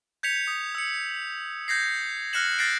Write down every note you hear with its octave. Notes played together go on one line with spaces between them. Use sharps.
G6 G#6 B6 C#7 F7
D#6
E6 C#7
G6 G#6 A#6 C7
F6 F#6 A#6 C#7 E7 F#7
F6 G6 A6 A#6 C7 D7